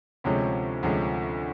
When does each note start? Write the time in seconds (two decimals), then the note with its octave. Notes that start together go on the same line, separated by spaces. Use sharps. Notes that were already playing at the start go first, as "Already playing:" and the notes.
0.24 D2 C3 F3 G#3 C#4
0.83 D2 C3 F3 G#3 C#4